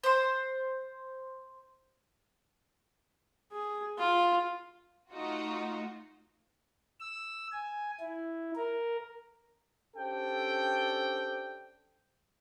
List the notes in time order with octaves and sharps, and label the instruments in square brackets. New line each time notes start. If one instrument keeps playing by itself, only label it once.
[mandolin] C5 C6
[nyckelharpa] G#4
F4
[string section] A3 D#4 F4 F#4
[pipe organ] E6
G#5
E4
A#4
[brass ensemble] C#4 D4 G4 A4 C5 G5